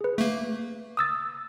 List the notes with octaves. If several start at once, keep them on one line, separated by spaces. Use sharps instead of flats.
G#4 B4
A3 A#3
D#6 E6 A6